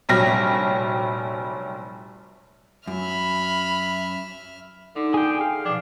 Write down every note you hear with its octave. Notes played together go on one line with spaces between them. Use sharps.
F1 A#1 F#3 G3 F6 A#6
F#2 E5 B5 F6
D3 D#4
G#4 G5
F5
B2 F3 D4